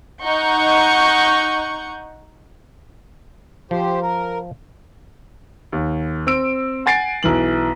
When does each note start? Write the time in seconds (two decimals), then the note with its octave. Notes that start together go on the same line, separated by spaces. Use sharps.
0.23 D#4 F#5 C#6 G6
3.71 F3 G4 C5
4.02 A#4
5.72 D#2
6.27 C4 E6 D7
6.86 F#5 G#5 A6 C7 D7
7.23 B1 E3 F#7